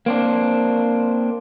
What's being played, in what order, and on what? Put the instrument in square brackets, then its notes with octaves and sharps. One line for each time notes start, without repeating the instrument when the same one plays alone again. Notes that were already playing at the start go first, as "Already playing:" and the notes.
[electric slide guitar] A#3 C4 D4